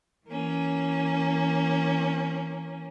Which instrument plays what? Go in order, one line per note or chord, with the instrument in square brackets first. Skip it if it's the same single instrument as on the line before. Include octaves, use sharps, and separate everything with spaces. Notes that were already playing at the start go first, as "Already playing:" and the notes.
[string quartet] E3 A#3 C#4